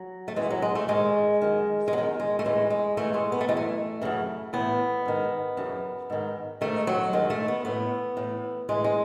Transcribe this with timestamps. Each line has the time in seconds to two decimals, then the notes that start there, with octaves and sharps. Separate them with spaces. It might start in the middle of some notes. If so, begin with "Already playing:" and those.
Already playing: F#3
0.28 A3
0.36 F#2 E3 G#3
0.51 F#3
0.62 G#3
0.75 A3
0.88 G#2 D#3 G#3
1.42 F#2 D#3
1.88 G#3
1.93 E2 D#3 F#3
2.20 G#3
2.39 A3
2.45 A2 E3 G#3
2.70 G#3
2.97 G#2 E3 A3
3.14 G#3
3.32 B3
3.41 A3
3.49 F#2 E3 G#3
3.57 A3
4.02 F#2 C#3 E3
4.53 A2 E3 B3
5.06 G#2 D#3
5.57 F#2 C#3 E3
6.10 G#2 D#3
6.61 G#2 D#3 A3
6.87 F#3
7.13 F#2 D#3 G#3
7.30 A3
7.48 B3
7.65 A2 E3 B3
8.17 A2 E3
8.69 A2 E3 G#3
8.84 G#3